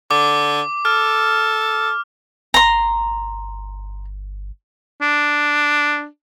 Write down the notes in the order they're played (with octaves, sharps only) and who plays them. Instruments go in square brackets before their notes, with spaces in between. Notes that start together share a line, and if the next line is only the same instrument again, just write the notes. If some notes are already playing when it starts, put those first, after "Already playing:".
[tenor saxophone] D3 [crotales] D6
[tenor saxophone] A4 [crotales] F6
[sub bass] G1 [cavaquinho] A#5 C6
[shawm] D4